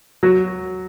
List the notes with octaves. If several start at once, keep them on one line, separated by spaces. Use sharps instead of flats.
F#3 F#4